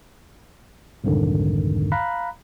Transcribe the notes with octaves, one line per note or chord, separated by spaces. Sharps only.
C2 F2 G#2 D3 D#3
F5 A#5 B5 F#6